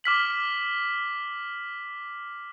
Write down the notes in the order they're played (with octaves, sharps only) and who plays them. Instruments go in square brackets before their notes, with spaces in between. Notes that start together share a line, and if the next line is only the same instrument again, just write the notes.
[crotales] D6 F6 B6 F#7